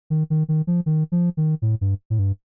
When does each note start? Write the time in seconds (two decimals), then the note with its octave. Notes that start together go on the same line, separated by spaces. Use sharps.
0.10 D#3
0.30 D#3
0.49 D#3
0.67 F3
0.86 D#3
1.12 F3
1.37 D#3
1.62 A2
1.81 G2
2.10 A2
2.19 G2